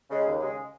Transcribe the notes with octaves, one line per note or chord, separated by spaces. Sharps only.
C#3 G#3
D#2
C#3 G#3